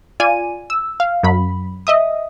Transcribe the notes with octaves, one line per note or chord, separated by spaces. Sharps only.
F4 D5 G#5 D#7
E6
F5
F#2 F#3 B5
D#5 E5 D#6